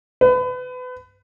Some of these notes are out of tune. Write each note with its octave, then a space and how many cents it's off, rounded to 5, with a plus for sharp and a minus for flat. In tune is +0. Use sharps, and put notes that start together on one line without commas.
B4 +30